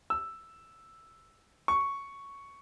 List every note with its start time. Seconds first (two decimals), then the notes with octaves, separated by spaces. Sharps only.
0.10 E6
1.68 C#6